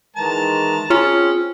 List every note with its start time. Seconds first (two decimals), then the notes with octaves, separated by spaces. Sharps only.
0.16 D#3 E3 G#3 A5 A#5
0.90 C4 C#4 F4 G#4